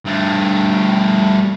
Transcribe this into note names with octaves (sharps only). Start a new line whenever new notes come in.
G2 A3